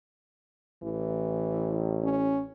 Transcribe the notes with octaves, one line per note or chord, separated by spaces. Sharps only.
A1 E3
C#4